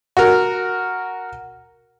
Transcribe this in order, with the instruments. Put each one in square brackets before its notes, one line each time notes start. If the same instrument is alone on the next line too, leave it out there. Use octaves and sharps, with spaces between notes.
[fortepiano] F#4 A#4